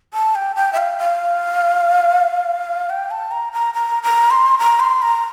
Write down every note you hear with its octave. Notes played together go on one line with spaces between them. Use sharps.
A5
G5
G5
E5
F5
F5
G5
A5
A#5
A#5
A#5
A#5
C6
A#5
C6
A#5